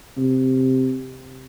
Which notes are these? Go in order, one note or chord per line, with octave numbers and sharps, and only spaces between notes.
C3